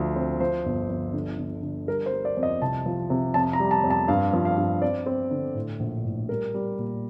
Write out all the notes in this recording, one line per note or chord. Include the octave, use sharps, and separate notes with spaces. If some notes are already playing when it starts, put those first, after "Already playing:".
Already playing: D2 F3
C4
F3 C5
G1
F3
D3
D3
D3
G3 A#4
C5
G3
D5
F2
D#5
C2 A5
F3
C3
F2 A5
A#5
G3
A5
F2
A5
G2 F5
F3
F5
G2
C4 D5
C4
D3
A2
A#1
A2
G3 A#4
G3
A#2